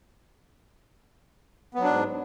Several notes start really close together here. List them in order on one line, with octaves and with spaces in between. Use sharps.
B3 F#3 D4 G#2